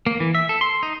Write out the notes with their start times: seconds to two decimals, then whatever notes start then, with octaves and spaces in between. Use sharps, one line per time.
0.07 A#3
0.20 E3
0.35 E5
0.49 A4
0.61 C6
0.83 D#4